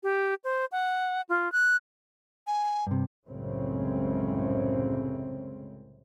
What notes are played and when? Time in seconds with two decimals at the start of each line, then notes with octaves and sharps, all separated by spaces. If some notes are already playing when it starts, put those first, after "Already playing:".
0.03 G4
0.44 C5
0.72 F#5
1.29 F4
1.52 F#6
2.47 G#5
2.87 G2 C3
3.28 C2 F#2 A2 C#3 G#3 C4